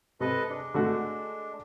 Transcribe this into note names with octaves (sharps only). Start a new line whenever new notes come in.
C3 A4 B4 D#5
G#3 D4
D3 A3 F#4